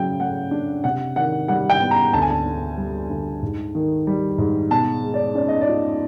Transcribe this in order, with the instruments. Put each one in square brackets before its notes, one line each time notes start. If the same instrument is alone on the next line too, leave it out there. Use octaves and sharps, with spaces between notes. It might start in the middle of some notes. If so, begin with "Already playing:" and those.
Already playing: [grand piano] C#3 F#3 [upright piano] G5
[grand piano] A3 [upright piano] F#5
[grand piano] D4
[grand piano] C3 [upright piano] F#5
[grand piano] D#3 [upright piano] F#5
[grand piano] G3 [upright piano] F#5
[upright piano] G5
[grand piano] B3
[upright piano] A#5
[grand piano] D2 [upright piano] A5
[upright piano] G#5
A5
[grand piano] D3
G3
D2
G#2
D#3
G3
G#2
[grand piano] B2 [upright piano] A5
[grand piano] G#3
[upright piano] D5
[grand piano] C#4 [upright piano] D5
[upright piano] D#5
D5
[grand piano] F4